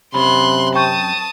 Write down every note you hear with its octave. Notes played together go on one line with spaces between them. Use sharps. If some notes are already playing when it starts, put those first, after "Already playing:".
F#2 C3 C#4 B5 C6 F#6
G5 A5 C#6 D#6 G6